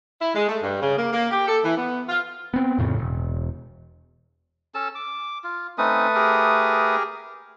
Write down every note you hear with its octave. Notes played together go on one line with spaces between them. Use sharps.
E4
G#3
A3
G2
C#3
A#3
A#3
G4
A4
E3
B3
F4
B3 C4
F2 A2 C#3
E1
C#4 A4 A5
D6
F4
A3 C4 C#4 D#4 B4 D#6
G4 G#4 A#4